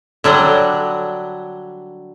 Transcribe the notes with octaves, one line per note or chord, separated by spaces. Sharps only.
D3 F#3 G3